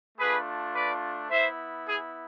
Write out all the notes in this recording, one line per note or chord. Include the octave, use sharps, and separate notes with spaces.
A3 D4 F4 G#4 B4
B4 D5
B3 E4 C5 E5
G#4